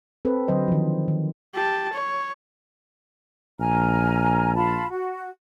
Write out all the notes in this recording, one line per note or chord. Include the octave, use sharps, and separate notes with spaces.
C4 A4 B4
D3 F#3 C5 D#5
D#3 F3
D#3
G4 A5
C#5
A#1 G#5 A#5 F6
F4 A5 B5
F#4